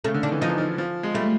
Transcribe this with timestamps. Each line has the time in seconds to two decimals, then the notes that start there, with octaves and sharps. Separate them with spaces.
0.04 C#3 A3
0.14 D3
0.23 D#3 D4
0.32 E3
0.41 F3 D#4
0.49 E3
0.58 F3
0.78 F3
1.03 G#3
1.14 G3 A3